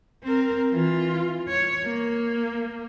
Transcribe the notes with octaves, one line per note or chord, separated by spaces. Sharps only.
C4 A#4
E3 F4
C#5
A#3